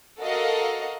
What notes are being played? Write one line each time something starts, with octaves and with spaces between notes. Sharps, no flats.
F#4 A4 A#4 D#5 F5